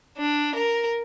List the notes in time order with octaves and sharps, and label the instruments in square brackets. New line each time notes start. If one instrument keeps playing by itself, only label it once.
[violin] D4
A#4